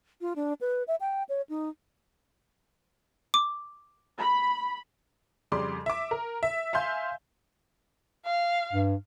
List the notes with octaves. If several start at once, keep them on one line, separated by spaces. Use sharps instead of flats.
F4
D4
B4
E5
G5
C#5
D#4
D6
B5
F2 C#3 G3 C6 D6
E5 D6
A#4
E5
E5 F5 G#5 C6 G6
F5
G2